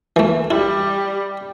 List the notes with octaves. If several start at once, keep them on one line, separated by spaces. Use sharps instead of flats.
E3 A3
G3 E4